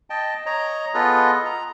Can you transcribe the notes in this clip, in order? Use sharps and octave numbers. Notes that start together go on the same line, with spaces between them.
D#5 G5 A5
C#5 D#5 A#5
B3 F4 G#4 A4 B4 D#5
A#5